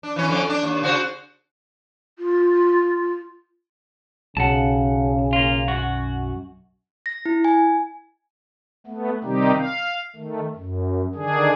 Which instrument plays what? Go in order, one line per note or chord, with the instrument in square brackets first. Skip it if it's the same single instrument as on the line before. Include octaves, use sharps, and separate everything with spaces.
[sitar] D4
E3 C#4
F2 D3 C#4
D4
D#2
C#3 F#4 C5
[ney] F4
[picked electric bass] B1 [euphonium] C#3 [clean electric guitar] F#5 A5
[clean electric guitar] A#3 F4
F#2 F#4
[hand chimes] A#6
E4
G#5
[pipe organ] A3 B3
C3 D#3 G3 C4 D#4 G4
F5
D#3 A3
F#2
D3 D#3 D4 G#4